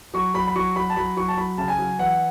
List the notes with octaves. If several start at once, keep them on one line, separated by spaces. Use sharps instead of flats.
F#3 C#6
F#3 B5
B5
F#3 C#6
F#3 B5
A5
F#3 B5
F#3 C#6
A5
F#3 B5
C#3 A5
G#5
F#3
E3 F#5